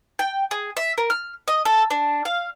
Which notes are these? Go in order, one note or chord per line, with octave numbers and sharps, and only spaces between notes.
G5
G#4
E5
A#4
F6
D#5
A4
D4
F5